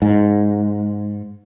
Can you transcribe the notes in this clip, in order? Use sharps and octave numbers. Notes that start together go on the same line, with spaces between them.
G#2